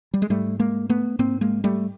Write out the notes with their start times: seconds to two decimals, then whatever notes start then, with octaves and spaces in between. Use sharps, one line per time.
0.14 G3
0.22 G#3
0.30 G#2 G3 A3
0.60 G#3 A#3
0.89 A3 B3
1.19 G#2 A#3 C4
1.41 G#3 A#3
1.64 G3 A3